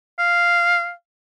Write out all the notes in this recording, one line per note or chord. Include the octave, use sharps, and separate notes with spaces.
F5